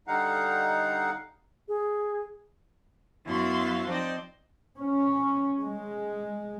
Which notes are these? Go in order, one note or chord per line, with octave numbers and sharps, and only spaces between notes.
D3 G3 D#4 F5 F#5
G#4
F#2 B3 E4 F#4 F5 C6
F3 C4 D#4 C5 D5
C#4
G#3